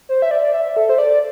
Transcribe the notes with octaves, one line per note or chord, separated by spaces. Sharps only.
C5
E5
D5
E5
A4
C5
D5